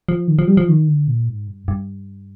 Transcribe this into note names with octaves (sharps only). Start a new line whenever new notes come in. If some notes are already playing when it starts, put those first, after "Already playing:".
F3
D#3
F3
G3
F3
D#3
D3
A#2
G#2
G2
G2